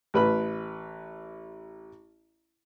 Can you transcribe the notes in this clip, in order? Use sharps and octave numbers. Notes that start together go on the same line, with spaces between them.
A1 B4 B5